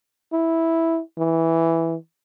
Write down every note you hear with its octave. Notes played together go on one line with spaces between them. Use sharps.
E4
E3